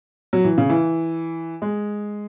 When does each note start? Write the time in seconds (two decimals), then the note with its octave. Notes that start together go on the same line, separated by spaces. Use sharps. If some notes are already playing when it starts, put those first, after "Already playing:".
0.33 F#3
0.44 E3
0.58 C#3
0.69 E3
1.62 G#3